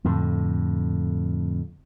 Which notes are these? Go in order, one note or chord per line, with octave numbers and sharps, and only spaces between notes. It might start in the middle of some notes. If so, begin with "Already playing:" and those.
F2 A2 D3